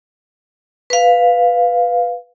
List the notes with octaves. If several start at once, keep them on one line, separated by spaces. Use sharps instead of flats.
B4 F5